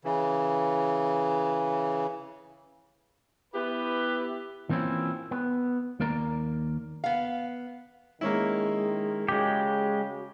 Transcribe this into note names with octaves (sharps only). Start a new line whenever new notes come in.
C#3 E3
B3 E4 G4 B4
E3 A#3 C4 C#4 E4 F4
B3
D#2 A#3 A#4 D5 A#5
B3 F5
D#3 G#3 A#3 C#4 E4
C#3 G#3 F#4 G4